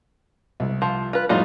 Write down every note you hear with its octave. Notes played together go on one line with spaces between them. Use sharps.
C2
F3
F4 B4
F2 A2 G3 D#4 F4 F#4